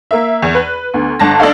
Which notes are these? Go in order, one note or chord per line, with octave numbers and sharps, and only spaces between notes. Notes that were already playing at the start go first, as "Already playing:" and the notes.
A#3 A#4 E5
E2
B4
D2 B3
G1 D3 A5 A#6
D4 A4 D#5 F5